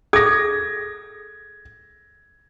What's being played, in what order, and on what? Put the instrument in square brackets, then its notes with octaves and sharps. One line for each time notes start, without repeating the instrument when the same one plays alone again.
[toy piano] G#4 A4 D#6 [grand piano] G#6 A#6